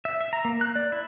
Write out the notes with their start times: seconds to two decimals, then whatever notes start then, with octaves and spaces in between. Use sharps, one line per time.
0.05 E5
0.21 E5
0.33 A#5
0.45 A#3
0.61 F#6
0.76 D5
0.92 E4